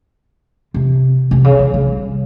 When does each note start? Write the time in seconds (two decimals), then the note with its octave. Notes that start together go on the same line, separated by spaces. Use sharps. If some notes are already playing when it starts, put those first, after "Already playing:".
0.74 C3
1.31 C3
1.44 C#3
1.59 C3
1.74 C#3
1.87 G3